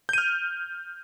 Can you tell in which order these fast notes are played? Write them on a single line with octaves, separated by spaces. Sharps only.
G6 D#7 F6